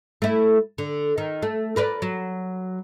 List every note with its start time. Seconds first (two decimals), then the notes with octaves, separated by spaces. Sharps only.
0.22 A3 E4
0.78 D3
1.18 D#3
1.42 A3
1.76 A#4 B4 D5
2.02 F#3